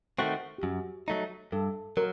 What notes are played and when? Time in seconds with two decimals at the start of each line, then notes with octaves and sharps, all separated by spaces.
0.19 D#3 A3 C4 F#4
0.58 G4
0.63 F#2 F#4
1.08 F#3 A3 D#4
1.52 G2 A4
1.97 F#3 A#4